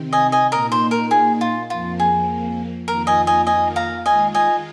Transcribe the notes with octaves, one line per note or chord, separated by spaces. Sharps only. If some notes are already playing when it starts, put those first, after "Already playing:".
Already playing: C3 D#3 C4
D#5 G#5
D#5 G#5
A#2 A#3 D#4 A#4 D#5
C5
A#4
G#4
F4
F2 F3 A#3 F4
G#4
F2 D#3 A#3 F4 A#4
D#5 G#5
D#5 G#5
D#5 G#5
F5 A#5
D#3 G#3 F4 D#5 G#5
D#5 G#5